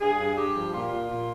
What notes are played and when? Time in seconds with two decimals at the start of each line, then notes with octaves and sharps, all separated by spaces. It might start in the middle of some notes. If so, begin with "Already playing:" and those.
0.01 G2 G#4
0.20 G2
0.37 G2 G4
0.56 F3
0.74 A#2 F4
0.92 A#2
1.10 A#2